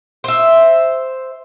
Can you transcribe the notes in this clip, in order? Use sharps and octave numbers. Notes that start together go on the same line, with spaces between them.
C5 E5